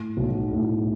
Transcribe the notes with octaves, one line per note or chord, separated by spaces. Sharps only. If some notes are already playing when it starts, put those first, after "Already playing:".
Already playing: A2
B1
A2